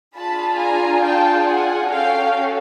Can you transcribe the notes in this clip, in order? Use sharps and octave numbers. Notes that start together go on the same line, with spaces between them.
D4 F4 G#4 A5 B5
G#5 A#5
G5 A5
F#5 G#5
C#4 F#4 A4 F5 G5